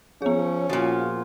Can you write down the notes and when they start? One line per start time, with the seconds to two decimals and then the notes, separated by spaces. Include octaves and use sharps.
0.22 F3 B3 C#4 G#4 C#5
0.69 A#2 F3 F4 F#4